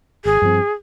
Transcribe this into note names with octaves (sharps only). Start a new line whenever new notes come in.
G#1 G#4
G2 F3 C4